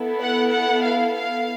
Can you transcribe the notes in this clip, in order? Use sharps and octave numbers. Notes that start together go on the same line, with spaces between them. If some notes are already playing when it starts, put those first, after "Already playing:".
Already playing: B3 E4 A4
F#5
F#5
F5
F5